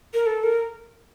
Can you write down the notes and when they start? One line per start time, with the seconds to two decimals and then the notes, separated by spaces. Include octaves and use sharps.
0.14 A#4
0.26 A4
0.43 A#4